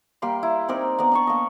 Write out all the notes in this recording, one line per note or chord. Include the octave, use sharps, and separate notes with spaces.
G3 A#3 G5 C6
E4
C4 D#4 A#4 D5
B3 D5 A#5
D4 A5 C#6
A#3 D#5